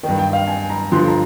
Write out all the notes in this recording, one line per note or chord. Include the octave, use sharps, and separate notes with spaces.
G2 D#3
G5
F5
G#5
A#5
G2 D3 F3 C6
A#5